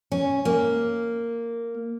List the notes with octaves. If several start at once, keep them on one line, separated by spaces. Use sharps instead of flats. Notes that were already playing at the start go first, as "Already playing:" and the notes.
C#4
A#3